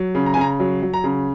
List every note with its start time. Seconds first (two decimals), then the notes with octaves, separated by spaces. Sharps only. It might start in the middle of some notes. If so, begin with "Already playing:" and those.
Already playing: F#3
0.15 C#3
0.26 A#5
0.34 G#5
0.37 C#3 A#5
0.60 F#3
0.83 F#3
0.94 A#5
1.04 C#3